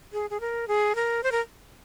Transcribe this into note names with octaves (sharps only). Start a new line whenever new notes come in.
G#4
G#4
A#4
G#4
A#4
C5
A#4